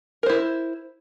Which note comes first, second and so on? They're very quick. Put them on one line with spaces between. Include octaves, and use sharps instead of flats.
A#4 C5 E4